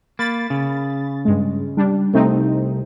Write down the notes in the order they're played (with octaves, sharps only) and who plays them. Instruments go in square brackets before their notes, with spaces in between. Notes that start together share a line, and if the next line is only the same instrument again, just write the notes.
[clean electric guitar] A#3 [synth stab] B5 A6
[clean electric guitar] C#3
[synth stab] G2 G#3
G3 D4
[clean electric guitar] C2 [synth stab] A3 C4 D#4